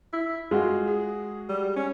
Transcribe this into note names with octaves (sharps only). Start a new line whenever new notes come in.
E4
G#3 F4 F#4
G#4
G3
C#4